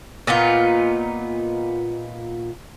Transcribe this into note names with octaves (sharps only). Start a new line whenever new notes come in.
A#2 B3 D#4 F4